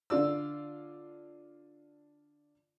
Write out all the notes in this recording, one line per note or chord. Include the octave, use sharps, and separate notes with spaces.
D3 D4 F4 D5 E6